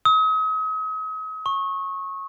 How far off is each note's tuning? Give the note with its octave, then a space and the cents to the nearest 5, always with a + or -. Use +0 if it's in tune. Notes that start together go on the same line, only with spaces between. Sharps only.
D#6 +40
C#6 -20